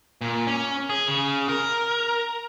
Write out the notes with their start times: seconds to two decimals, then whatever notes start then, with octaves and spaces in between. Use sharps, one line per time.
0.21 A#2
0.47 C#4
0.90 G#4
1.08 C#3
1.49 A#4